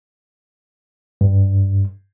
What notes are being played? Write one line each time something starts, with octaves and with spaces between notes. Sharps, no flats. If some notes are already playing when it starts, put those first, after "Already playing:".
G2